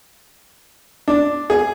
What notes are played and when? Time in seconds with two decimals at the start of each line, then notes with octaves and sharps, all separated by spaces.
1.08 D4
1.50 G#4